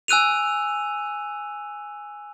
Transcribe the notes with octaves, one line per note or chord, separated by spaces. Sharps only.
G#5 E6 F#6 D#7 F7